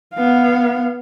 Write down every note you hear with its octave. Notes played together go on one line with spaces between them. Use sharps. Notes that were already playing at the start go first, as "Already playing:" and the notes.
B3 F5